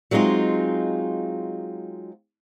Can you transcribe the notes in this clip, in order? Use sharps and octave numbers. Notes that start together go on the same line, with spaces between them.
F#3 G#3 C4 D#4 F4